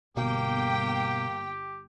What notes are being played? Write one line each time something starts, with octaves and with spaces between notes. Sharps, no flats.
G1 B2 A#3 G4 G5